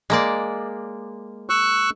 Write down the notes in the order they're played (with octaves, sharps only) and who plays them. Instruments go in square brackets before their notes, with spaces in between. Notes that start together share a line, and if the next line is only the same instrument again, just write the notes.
[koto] G#3 A#3 D5
[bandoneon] C#6 E6 F#6